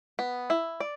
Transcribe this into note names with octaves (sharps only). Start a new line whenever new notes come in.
B3
E4
D5